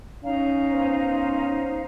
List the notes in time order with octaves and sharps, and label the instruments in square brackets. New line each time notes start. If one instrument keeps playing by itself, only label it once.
[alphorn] C#4 [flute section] D#4 F5 A#5
[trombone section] B3 C5